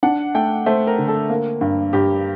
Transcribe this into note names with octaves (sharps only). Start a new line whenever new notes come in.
D4 F#5
A3 G5
A3 C5
A#4
D3
A4
A#3
G2
G2 G4